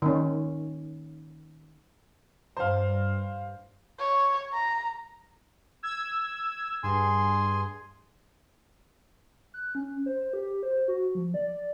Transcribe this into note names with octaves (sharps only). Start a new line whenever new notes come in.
D#3 C#4
G2 C5 F5
C#5
A#5
E6 G#6
G2 G#4 G#5 C6
F#6
C#4
C5
G4
C5
F#4
F3
D5